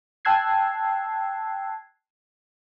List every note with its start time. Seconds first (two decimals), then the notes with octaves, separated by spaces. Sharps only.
0.25 G5 A5 E6 F#6 G#6 C7